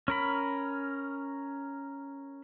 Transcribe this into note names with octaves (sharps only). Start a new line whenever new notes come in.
C#4 A#4 B5